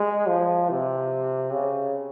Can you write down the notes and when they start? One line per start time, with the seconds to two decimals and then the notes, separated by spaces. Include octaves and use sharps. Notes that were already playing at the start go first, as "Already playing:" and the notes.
Already playing: G#3
0.28 F3
0.69 C3
1.53 C#3